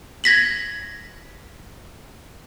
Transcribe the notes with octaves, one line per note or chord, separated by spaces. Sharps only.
G#6 A#6 B6 F#7